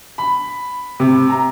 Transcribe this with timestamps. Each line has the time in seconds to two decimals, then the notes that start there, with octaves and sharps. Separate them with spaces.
0.18 B5
1.00 C3
1.30 A#5